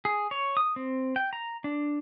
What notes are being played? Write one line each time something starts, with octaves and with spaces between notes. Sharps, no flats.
G#4
C#5
D#6
C4
G5
A#5
D4